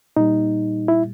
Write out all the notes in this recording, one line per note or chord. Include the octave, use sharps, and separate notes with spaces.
A#2 G3 D#4
E4